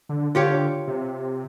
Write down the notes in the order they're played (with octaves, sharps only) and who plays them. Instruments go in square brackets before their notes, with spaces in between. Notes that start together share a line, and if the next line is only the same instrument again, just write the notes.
[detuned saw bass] D3
[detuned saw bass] D3 [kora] F4 G4 C#5
[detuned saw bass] C3